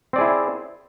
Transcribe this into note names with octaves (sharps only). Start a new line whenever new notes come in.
C4 E4 G#4 D5